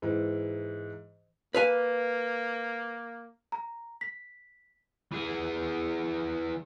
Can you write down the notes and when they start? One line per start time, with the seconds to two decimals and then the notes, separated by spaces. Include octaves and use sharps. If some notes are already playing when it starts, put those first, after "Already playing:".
0.02 G#2 E3
1.55 A#3 B4 F5 G#5
3.52 A#5
4.01 B6
5.12 E3 G#4